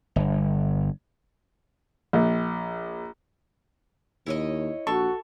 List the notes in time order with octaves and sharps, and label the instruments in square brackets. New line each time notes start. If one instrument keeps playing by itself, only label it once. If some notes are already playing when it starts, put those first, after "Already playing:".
[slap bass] G1
[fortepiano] A#1
[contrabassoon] D#2 [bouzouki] E4 C#5 D#5
[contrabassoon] A#1 [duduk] F#4 [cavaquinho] A4 C#6